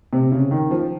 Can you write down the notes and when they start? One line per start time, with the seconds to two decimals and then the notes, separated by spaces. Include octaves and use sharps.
0.13 C3
0.32 C#3
0.51 D#3
0.71 F3